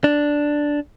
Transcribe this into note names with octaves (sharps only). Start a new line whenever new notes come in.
D4